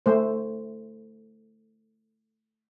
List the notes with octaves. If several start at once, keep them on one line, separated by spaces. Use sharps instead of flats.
A3 C5